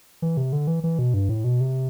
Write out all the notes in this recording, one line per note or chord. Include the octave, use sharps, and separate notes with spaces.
E3
C3
D3
E3
E3
B2
G2
A2
B2
C3